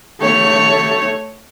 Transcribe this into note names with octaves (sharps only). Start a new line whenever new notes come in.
A3 C#5